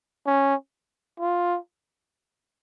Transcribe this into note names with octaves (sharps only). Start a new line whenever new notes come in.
C#4
F4